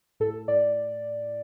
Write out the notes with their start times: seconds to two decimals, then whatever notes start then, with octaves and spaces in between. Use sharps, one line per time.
0.20 A2 A4
0.48 A2 D5